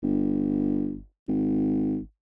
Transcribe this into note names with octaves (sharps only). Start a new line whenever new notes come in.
G1
G#1